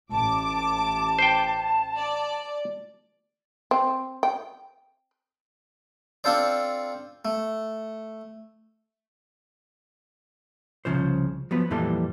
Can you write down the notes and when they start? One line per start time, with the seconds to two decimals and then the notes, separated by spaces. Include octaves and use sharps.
0.10 A1 A5 D6
1.19 C5 G5
1.97 D5
3.71 C4
4.23 G5
6.24 C4 D4 F4 A4 C5 D5
7.25 A3
10.85 C2 G#2 C#3 F3 C5
11.51 F3 F#3 B3 B4
11.71 F2 A#2 E3 G3 A4 C6